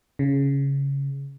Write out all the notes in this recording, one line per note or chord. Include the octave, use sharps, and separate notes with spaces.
C#3